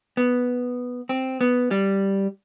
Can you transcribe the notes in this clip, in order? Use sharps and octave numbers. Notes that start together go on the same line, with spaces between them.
B3
C4
B3
G3